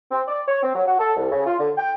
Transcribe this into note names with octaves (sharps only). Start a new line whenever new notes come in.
C4
D5
C#5
C4
F#3
F#4
A4
C2
C#3
F4
D3
G5